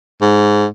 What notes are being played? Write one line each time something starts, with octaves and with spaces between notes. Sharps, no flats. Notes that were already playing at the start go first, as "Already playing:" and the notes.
G#2